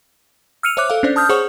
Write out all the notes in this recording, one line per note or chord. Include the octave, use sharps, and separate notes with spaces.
E6 F6 C#7 D#7 F7
C5 C#5 E5 D6 F#6
A4 F5
C#4 D4 C5 D5
A5 D#6 F6 G6
G#4 C5 C#5 F#5 C#6